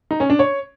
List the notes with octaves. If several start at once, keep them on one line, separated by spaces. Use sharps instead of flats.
D#4
C#4
D4
C#5